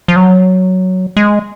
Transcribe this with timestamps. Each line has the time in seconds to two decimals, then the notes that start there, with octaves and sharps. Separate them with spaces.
0.08 F3
0.16 F#3
1.17 G#3